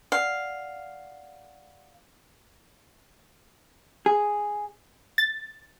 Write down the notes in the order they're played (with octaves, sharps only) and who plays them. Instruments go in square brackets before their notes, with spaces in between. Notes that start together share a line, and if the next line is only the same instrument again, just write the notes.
[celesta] D5 F#5 [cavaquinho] F5
[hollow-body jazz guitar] G#4
[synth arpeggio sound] A6